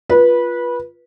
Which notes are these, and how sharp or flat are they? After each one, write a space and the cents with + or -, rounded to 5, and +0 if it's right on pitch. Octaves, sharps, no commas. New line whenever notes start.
F4 +0 B4 -20